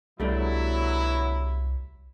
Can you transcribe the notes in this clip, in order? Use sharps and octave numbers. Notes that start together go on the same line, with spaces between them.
C2 B2 F#3 G3 A3 D4 E4